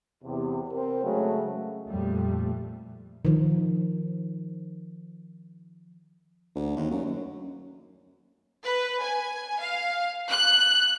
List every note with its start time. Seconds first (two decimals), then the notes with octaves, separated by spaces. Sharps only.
0.24 E2 C3
0.71 C4 A#4 C5
1.03 C#3 F#3 G#3 A3
1.88 F2 A#2 G3 A3
3.25 D#3 F3
6.55 D2
6.76 D#2
6.91 F#2
7.06 F#2
8.62 B4
9.01 G#5
9.59 F5
10.29 F#6